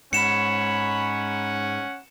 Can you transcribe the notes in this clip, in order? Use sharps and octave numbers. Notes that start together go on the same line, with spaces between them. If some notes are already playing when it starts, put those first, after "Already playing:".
G#2 C#4 C#5 F#5 B5 C#7 E7